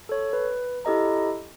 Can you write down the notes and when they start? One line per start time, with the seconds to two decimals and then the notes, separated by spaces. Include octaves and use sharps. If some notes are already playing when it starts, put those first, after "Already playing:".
0.09 A4 C#5
0.33 B4
0.85 E4 G4 A4 D#5 A#5